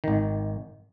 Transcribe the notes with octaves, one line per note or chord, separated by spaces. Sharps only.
G#1 D#3